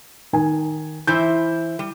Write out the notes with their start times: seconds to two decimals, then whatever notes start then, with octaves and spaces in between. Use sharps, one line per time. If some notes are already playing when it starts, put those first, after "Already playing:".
0.33 D#3 G#5
1.07 E3 E4 C5 G6
1.79 G3